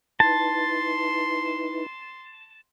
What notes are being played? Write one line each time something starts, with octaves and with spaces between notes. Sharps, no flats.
D#4 E4 B4 A5 C6